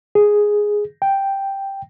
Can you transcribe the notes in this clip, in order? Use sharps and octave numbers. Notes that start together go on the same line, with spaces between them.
G#4
G5